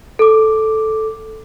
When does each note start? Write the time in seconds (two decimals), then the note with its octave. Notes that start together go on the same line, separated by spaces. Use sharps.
0.19 A4 D6